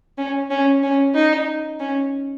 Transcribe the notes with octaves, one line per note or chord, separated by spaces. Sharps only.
C#4
C#4
C#4
D#4
C#4